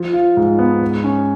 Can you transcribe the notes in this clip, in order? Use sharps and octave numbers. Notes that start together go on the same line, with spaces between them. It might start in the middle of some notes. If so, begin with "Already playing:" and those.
Already playing: F3
F4
G#2
B3
G#2
C#4